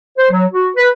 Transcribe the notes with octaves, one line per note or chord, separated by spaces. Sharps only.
C5
F#3
F#4
B4